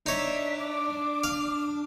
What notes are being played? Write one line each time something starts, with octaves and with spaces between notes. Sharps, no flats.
D4 D#4 C#5 E5
D6
F5